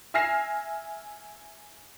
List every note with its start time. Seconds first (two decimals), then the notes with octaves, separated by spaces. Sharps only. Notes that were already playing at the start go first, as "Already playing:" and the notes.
0.14 E5 G#5 F6 A#6 C7 E7